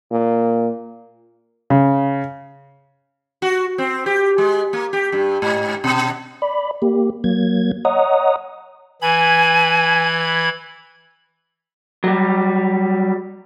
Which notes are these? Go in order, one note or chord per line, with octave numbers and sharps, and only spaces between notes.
A#2
C#3
F#4
C4
G4
G#3
A#3
G4
G2
G#2
B2
D5 B5
A#3 G4
F#3 A#3 G#6
C#5 D#5 F#5 A#5 D#6
E3 G#5 B5 G#6
F#3 G3